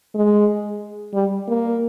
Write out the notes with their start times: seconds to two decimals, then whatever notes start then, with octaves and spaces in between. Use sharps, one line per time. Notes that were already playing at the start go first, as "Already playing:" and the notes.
0.15 G#3
1.14 G3
1.48 A#3